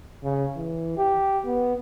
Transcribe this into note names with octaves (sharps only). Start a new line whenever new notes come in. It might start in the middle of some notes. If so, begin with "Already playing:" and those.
C#3
E3
G4
B3